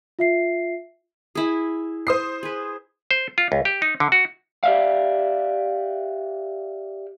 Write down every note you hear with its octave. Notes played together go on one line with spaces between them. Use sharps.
F4 E5 C7
E4 G#4
C5 D#6 C7
G#4 B4
C5
F4
C#2
G4
D#4
D3
F#4
G4 D5 E5 F5